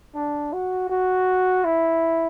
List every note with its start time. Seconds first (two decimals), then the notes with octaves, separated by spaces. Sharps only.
0.15 D4
0.53 F#4
0.90 F#4
1.65 E4